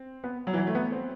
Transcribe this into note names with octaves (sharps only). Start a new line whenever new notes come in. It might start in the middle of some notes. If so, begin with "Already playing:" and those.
Already playing: C4
B3
F#3
E3
F#3
A3
B3
C4